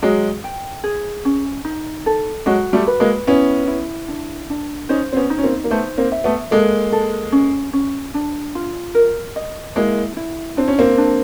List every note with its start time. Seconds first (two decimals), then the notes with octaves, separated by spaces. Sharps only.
0.02 F#3 G#3 G#4
0.44 G5
0.84 G#4
1.25 C#4
1.65 D#4
2.06 A4
2.46 F#3 G#3 F#4
2.73 G3 A3
2.87 B4
3.00 G#3 A#3
3.27 B3 C#4 E4
3.67 E4
4.08 D4
4.50 D4
4.89 C#4 D#4 C5
5.13 C4
5.16 B3 C#4
5.30 D#4
5.38 C#4
5.43 A#3 C4
5.64 A#3
5.71 A3 B3 C5
5.98 A#3 C4
6.12 E5
6.24 A3 B3
6.51 G#3 A#3 A4
6.92 A4
7.32 C#4
7.73 C#4
8.14 D4
8.55 F4
8.95 A#4
9.36 D#5
9.76 G#3 A#3 E4
10.17 E4
10.57 C4 D4
10.68 C#4
10.79 A#3 C4
10.98 D4